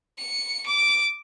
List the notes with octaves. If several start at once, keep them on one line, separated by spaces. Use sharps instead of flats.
C#7
D6